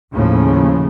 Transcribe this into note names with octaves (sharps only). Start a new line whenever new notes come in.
D#2 A2 C#3 F3